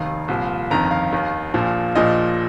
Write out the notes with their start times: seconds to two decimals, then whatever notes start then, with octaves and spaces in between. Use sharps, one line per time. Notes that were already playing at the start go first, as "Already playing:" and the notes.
Already playing: F1 D#2 D#3 F5
0.28 C2 A#2 F3
0.70 G1 F2 D#3 A#5
0.91 F5
1.12 D#2 D#3
1.54 A#1 A#2 F3
1.95 A#1 A#2 F3 D#5